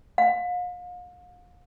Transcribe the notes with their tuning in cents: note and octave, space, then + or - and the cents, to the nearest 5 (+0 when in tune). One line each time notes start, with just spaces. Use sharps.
F5 +40